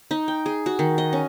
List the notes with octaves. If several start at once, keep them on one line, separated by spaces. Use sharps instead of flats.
D#4
G5
G#4
F#4
D#3
D#5
C#4